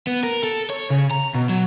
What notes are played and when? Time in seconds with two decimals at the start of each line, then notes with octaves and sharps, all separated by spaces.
0.07 B3
0.23 A#4
0.44 A4
0.70 C#5
0.90 C#3
1.11 A#5
1.34 B2
1.49 F#3